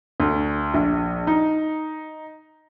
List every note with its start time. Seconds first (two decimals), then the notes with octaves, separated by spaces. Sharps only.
0.20 D2
0.74 A#1
1.27 D#4